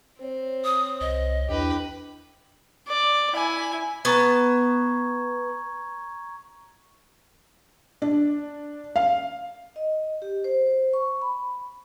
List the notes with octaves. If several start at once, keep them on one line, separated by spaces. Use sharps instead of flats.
C4 C5 C#5
D#6
C2 D#5
E2 D4 E4 G4 B4 G5
D5
E4 G#5
B3 A5 A#5 C#6 G#6
D4
F5
D#5
G4
C5
C#6
B5